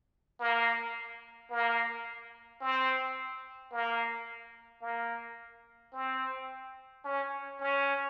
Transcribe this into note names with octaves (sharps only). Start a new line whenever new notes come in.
A#3
A#3
C4
A#3
A#3
C4
C#4
C#4